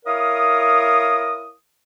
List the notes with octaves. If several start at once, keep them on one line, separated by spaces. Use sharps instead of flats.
E4 A#4 C#5 F5 D#6